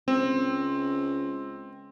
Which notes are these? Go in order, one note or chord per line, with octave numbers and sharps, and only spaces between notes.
C#2 C4